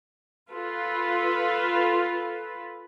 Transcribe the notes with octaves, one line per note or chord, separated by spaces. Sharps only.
F4 A4 B4